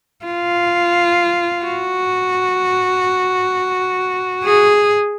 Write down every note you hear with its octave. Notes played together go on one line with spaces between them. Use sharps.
F4
F#4
G#4